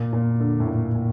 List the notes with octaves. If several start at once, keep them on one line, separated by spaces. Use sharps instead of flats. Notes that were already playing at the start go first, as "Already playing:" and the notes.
Already playing: A#2
A#2
D3
A2
A#2
A#2